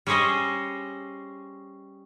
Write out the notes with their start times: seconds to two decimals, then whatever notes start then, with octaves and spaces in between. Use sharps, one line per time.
0.07 G3 C#4 G#4 C5 D#5